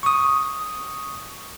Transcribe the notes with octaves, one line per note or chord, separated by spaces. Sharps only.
C#6 D#6